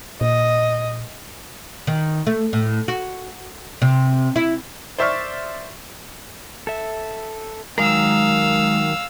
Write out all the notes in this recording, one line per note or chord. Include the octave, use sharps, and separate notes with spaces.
A#2 D#5
D#3
A3
A2
F#4
C3
E4
C5 D5 E5 C6 C#6 F6
A4 E5
D#3 F#3 G#3 A#4 F5 D#6 E6